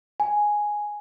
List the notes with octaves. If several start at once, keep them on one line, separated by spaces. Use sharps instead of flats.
G#5